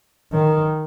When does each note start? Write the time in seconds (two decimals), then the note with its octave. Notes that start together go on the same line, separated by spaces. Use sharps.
0.33 D#3